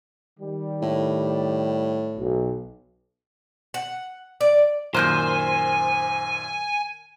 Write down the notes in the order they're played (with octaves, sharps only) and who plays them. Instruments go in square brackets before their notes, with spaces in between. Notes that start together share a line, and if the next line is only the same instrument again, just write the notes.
[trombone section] D#3 G3
[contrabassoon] A2
[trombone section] B1
[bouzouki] F#5
D5
[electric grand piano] F#2 A#2 D#3 [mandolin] A#4 F#6 G6 [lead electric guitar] C5 [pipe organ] G#5